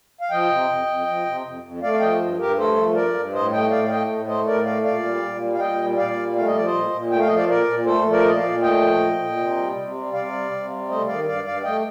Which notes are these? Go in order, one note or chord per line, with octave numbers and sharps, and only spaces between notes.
F5
F3 D#5 G5
C3
F2
F2
F3
C3
F2
F2
A3 D5 F5
F5
F3 D#5 G5
G2
G2 G4 A#4
A3 A4 C5
F3
G2 A#4 D5
G2
A2 C5 D#5
A3 D#5 G5
A2 D5 F5
F5
A3 D#5 G5
A2
A3 C5 D#5
A2 A#4 D5
A3 D5 F5
A#2 D5 F5
G3
A#2
G3
F5
A#2 D#5 G5
G3
A#2 D5 F5
G3
A3 F5
D#5
F3 D5
C5 D#5
A#2
A#2
A3 G5
F5
F3 D#5
D5 F5
A#2 A#4 D5
A#2
A3 A4 C5
F3
A#4 D5
A#2 D#5
D5 F5
A#2
A3 D#5 G5
F3
A#2
A#2
C3
G3
C3
G3
C3 D5 F5
G3
C3
G3
A3 C5 D#5
D#3 D5 F5
G2 D5 F5
G2 D5 F5
A3 D#5 G5